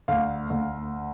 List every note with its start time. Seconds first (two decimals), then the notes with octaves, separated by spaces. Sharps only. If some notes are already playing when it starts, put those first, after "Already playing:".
0.08 D2 F5
0.50 D2